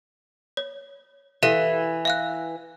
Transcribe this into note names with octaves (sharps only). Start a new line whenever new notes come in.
C#5
E3 G4 A4 F5
E5 F5 F#6